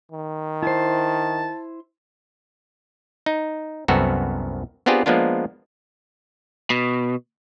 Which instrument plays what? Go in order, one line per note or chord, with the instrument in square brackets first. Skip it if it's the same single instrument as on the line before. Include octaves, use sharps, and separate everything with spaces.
[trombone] D#3
[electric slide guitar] E4 C5 [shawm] A5
[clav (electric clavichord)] D#4
C2 F#2 B3 C4 F#4 A4
B3 C4 D4 F4 G4 G#4
F3 G#3 A#3 B3 D4 F4
[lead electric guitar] B2